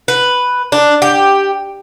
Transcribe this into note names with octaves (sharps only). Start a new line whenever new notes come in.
B4
D4
G4